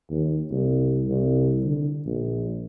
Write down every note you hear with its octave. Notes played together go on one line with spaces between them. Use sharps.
D#2
C2
C2
D3
A#1